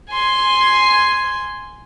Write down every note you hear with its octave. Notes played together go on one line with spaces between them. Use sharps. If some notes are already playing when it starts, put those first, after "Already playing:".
G#5 C6